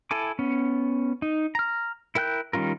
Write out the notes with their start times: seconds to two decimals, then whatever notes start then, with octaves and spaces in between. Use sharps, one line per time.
0.11 E4 A4 G#5 D6
0.39 B3 C#4
1.22 D#4
1.55 A#5 F6
2.15 E4 A#4 G5 F#6 G6
2.53 D#3 G3 C#4 F4 A#4